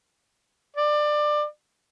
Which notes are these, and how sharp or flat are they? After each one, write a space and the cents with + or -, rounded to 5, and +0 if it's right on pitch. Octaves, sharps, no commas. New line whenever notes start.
D5 +20